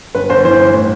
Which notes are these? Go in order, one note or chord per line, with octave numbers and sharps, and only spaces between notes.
G1 B4
G1 C5
E3 C5
G1
A2